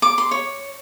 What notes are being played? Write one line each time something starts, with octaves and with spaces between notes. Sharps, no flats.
D6
C6
C#5